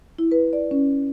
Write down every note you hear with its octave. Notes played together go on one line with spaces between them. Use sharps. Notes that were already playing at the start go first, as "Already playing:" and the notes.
E4
B4
D5
C#4